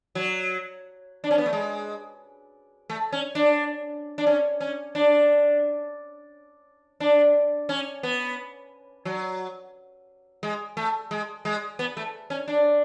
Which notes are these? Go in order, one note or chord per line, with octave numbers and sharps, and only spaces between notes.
F#3
D4
C#4
B3
A3
G#3
A3
C#4
D4
D4
C#4
C#4
D4
D4
C#4
B3
F#3
G#3
A3
G#3
G#3
B3
A3
C#4
D4